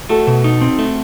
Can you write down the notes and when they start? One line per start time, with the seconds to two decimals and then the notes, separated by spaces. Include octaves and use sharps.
0.09 A3 F#4 A4
0.27 B2
0.44 D#4
0.61 C4
0.79 A3